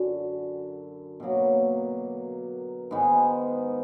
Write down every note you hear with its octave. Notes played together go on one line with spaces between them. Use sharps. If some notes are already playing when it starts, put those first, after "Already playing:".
Already playing: F#2 D3
B2 F#3 A#3
G#2 D#3 G#3 B3